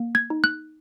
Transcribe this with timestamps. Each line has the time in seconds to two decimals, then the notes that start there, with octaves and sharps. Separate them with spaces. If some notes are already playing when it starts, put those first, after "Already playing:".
Already playing: A#3
0.15 G#6
0.30 D#4
0.44 F#6